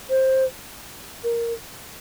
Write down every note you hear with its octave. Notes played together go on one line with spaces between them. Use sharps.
C5
A#4